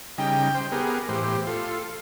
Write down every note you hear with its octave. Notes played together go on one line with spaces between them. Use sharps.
C#3 G3 D#4 G5
C5
B3 G4 G#4 A#4
A2 E3 G4 C5
F4 A4